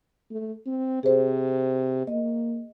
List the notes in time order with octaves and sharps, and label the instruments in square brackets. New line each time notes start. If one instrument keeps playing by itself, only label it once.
[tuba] A3
C4
[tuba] C3 [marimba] G#4 C5
[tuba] A#3 [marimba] D#5